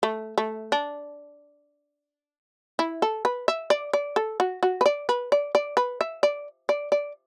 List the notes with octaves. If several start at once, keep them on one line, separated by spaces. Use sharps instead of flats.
A3
A3
D4
E4
A4
B4
E5
D5
D5
A4
F#4
F#4
B4
D5
B4
D5
D5
B4
E5
D5
D5
D5